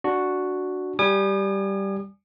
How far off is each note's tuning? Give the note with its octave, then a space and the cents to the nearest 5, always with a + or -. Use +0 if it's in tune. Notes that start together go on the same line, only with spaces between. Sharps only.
D4 +0 F#4 +0
G3 +0 G#5 +0 D#6 -45